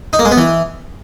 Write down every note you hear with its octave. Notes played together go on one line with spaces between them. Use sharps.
D#4
A#3
G#3
B3
E3